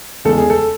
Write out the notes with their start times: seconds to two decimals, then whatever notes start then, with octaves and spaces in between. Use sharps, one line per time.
0.25 E2 C#3 G#3 B3 A4
0.38 G#4
0.50 A4